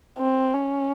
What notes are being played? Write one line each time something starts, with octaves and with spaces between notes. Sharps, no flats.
C4
C#4